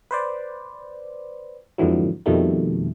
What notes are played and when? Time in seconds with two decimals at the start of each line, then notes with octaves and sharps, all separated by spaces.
0.11 B4 C5 D5
1.78 F2 G#2 D3 E3 F#3
2.26 F2 B2 D#3 G3 A3